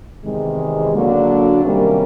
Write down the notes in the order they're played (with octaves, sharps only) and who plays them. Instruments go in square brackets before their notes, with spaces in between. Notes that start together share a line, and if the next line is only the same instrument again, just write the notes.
[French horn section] E2 C3 D#3 G#3
D3 F#3 A#3 D4 F#4
C3 D#3 G3 A#3 C#4